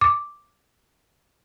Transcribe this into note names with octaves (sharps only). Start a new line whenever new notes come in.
D6